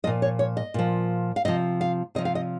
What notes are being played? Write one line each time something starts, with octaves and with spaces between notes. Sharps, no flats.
A#2 F3 D#5
C#5
C#5
D#5
A#2 F3
F5
C3 F3 D#5
F5
C3 F3 D#5
F5
D#5